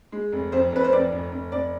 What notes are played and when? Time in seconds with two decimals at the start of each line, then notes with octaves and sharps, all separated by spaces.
0.12 G#3
0.32 F1
0.52 F2 C5
0.72 F1 B4
0.84 C5
0.93 F2 D5
1.12 F1
1.32 F1
1.52 F1 D5